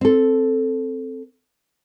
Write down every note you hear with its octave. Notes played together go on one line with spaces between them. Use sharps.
C4 A4